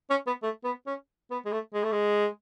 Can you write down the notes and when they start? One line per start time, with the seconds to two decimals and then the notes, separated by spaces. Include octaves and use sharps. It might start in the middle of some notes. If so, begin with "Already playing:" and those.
0.10 C#4
0.27 B3
0.43 A3
0.64 B3
0.87 C#4
1.31 B3
1.45 G#3
1.52 A3
1.74 G#3
1.84 A3
1.92 G#3